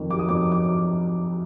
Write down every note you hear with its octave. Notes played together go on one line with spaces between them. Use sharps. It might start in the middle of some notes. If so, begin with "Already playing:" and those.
Already playing: F2 D#3
F#3 D6
D#6
F2 D6
D6